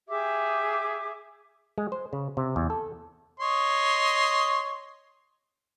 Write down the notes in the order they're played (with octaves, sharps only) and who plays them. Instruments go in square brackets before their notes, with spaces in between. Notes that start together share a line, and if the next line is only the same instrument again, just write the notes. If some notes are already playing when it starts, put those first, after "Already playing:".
[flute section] G4 G#4 E5 D6
[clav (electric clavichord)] G#3
C5
C#3
C3
E2
A4
[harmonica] C#5 D#5 C6